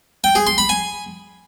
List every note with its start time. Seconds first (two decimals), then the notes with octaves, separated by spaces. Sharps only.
0.24 G5
0.35 G#4
0.47 C6
0.58 B5
0.69 G#5